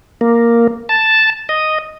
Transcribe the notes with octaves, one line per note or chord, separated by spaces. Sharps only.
A#3
A5
D#5